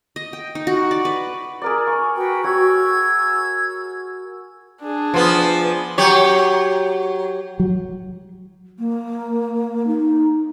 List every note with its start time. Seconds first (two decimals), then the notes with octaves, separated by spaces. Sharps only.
0.16 D#5
0.33 G5
0.55 D#4
0.67 F#4
0.91 D5
1.05 B4
1.62 G#4 A#4 D5
1.87 G#5 C#6
2.16 F#4 B4 G5
2.44 F#4 C#5 E6 G#6
4.81 D4 G#4
5.14 F3 B3
5.98 F#3 G4 C#5
7.60 F#3
8.79 A#3
9.87 D#4